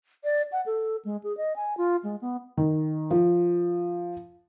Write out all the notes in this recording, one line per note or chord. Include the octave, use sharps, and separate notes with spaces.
D5
F#5
A4
G#3
G#4
D#5
G#5
F4
G#3
B3
D#3
F3